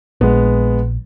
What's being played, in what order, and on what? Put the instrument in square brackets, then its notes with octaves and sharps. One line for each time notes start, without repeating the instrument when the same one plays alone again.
[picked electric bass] A#1 [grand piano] G#3 B3